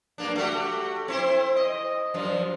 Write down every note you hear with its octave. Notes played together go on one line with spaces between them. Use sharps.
G2 A#3 D4
A3 F#4 G4
C4 E4 C5
D#5
F#2 F3